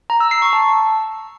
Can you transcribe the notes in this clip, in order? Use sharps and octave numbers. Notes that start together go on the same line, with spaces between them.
A#5
E6
C7
C#6
A5